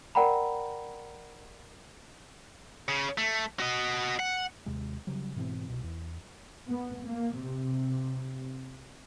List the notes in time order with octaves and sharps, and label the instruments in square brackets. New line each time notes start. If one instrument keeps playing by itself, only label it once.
[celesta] A#4 D5 F#5 G5 A#5 B5
[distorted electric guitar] C#3
A3
F#4 D#5
F#5
[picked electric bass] D#2 C3 G#3
C#3 F#3 G3
G#2 B2 E3 C4
C2 B2
E2
[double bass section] B3
A#3
C3